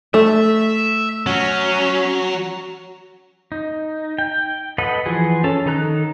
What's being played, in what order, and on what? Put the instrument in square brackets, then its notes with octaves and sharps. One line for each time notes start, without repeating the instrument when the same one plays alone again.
[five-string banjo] A3 [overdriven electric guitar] E5
[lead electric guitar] F#3 [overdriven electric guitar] C#4
[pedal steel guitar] D#4
G5
A4 B4 D#5 F#5
E3 F3 F#4 G#4
C#4 A4 A5
D#3 D#4 A4 A#5 F#6